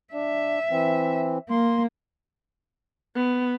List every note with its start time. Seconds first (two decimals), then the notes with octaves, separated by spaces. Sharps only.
0.14 D4 E5
0.71 E3 C4
1.50 A#3 C6
3.16 B3